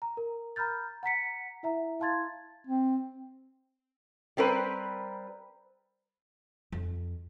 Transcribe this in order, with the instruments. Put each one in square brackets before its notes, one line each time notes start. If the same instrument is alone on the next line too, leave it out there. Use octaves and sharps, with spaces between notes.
[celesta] A#5
A#4
A#5 B5 F6 G6 A6
F#5 A#5 B6 C#7
E4 E5 A#5
E4 F5 A5 C6 G#6 A6
[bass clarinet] C4
[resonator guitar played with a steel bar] G3 C4 A#4 B4
[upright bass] F2